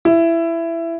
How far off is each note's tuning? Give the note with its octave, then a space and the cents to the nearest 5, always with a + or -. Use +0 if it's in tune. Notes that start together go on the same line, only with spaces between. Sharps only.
E4 +15